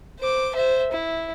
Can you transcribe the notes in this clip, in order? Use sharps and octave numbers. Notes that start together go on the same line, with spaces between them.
C5 D6
C5 E5
E4